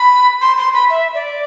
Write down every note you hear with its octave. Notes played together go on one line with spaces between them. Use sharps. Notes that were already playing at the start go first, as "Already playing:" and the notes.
Already playing: B5
C6
C6
B5
E5
D5